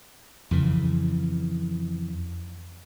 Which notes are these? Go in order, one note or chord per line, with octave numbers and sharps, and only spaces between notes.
F2 C#3 E3